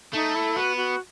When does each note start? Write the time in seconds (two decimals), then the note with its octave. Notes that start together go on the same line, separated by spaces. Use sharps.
0.14 A3 D#4
0.35 E4
0.56 B3 F#4
0.77 F#4